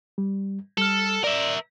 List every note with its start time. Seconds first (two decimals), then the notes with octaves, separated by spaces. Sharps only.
0.18 G3
0.78 G3 A4 F6
1.24 A#4 D5 E5